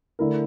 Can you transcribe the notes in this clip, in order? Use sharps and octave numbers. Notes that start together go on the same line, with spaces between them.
D3 A3 E4 A#4